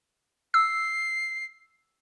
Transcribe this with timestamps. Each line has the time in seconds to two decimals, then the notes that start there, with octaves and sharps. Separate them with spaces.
0.54 E6 C7